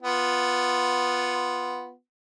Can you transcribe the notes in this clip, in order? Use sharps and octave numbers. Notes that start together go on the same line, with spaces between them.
B3 F4